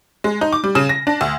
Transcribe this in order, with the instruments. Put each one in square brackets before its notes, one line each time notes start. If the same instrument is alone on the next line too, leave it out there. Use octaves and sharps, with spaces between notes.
[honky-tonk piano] G#3
D#4
D6
G3
C#3
A#6
D4
D2